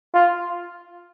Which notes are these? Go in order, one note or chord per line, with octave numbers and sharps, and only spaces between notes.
F4